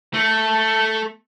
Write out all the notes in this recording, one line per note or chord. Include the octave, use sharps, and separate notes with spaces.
A3